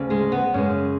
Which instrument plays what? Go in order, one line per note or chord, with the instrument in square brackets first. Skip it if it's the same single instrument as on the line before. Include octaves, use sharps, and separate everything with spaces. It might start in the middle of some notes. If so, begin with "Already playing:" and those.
Already playing: [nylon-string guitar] D2 C#3
G#3 G#4
B3
F#2 C#3 G#3 C#4